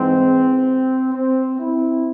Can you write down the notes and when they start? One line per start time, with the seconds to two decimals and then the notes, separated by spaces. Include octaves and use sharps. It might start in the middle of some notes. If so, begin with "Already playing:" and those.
Already playing: G#2 E3 G#3 C4
1.14 C4
1.60 C4 E4